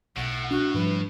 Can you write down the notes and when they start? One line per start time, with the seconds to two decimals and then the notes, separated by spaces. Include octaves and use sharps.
0.17 B1 A2 F#5
0.51 D4 F#4
0.74 G#2 F3 G3 B4